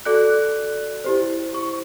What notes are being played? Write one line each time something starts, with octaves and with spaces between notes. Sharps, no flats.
F#4 A4 D5 F#6
E4 G4 C5
C#6